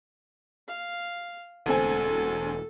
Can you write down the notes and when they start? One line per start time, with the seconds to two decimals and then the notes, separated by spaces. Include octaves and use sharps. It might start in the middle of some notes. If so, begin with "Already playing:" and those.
0.68 F5
1.66 E1 D2 C4 A4 G#5